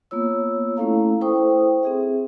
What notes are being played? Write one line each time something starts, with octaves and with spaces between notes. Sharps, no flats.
A#3 B3 F4 C#5 E6
A3 C#4 E4 A4 F5 A#5
E4 A4 C5 G5 C#6 D#6
C4 G#4 E5